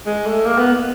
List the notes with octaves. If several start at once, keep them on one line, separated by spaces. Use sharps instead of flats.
G#3
A3
A#3
B3